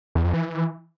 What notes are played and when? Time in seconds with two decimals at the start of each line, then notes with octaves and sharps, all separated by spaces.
0.15 E2
0.25 F2
0.34 E3